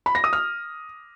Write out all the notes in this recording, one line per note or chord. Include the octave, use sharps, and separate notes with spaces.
B5
A#6
D#6
F6